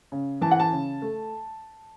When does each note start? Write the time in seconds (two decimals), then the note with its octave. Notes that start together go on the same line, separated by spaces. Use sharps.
0.12 C#3
0.42 E3 A5
0.51 F#5
0.60 A5
0.72 C#3
1.02 A3